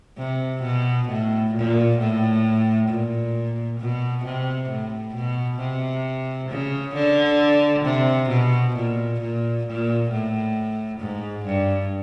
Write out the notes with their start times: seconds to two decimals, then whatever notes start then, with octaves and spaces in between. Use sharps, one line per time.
0.18 C3
0.62 B2
1.08 A2
1.54 A#2
1.99 A2
2.89 A#2
3.79 B2
4.24 C3
4.69 A2
5.14 B2
5.60 C3
6.49 C#3
6.95 D3
7.84 C3
8.30 B2
8.76 A#2
9.20 A#2
9.66 A#2
10.10 A2
11.00 G#2
11.45 G2